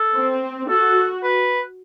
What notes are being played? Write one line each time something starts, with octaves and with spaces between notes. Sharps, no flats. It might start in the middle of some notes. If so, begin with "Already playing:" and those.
Already playing: A4
C4
F#4 A4
B4